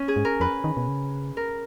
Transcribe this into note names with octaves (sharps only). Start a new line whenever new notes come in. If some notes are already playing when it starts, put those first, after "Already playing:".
Already playing: C#4
G#4
G#2
A#4
F2 B4
D#3
B2
C#3
A#4